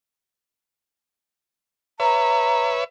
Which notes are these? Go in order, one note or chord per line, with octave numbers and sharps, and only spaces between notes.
B4 C#5 E5 A#5